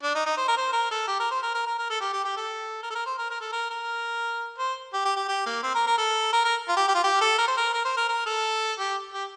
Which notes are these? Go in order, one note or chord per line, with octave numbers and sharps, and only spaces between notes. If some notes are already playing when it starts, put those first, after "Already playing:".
D4
D#4
D#4
C5
A#4
C5
A#4
A4
G4
A#4
C5
A#4
A#4
A#4
A#4
A4
G4
G4
G4
A4
A#4
A4
A#4
C5
A#4
A#4
A4
A#4
A#4
C5
G4
G4
G4
G4
A#3
C4
A#4
A#4
A4
A#4
A#4
F4
G4
G4
F4
G4
A4
A#4
C5
A#4
A#4
C5
A#4
A#4
A4
G4
G4